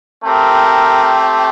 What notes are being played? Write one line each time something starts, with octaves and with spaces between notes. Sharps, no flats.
A3 C4 G4 A#4